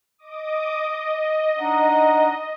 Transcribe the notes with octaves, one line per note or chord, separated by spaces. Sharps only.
D#5 D6 D#6
D#5
D4 D#4 F#5